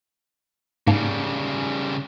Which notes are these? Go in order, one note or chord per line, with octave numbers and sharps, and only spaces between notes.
G#2 C#3 G3 A#3 A5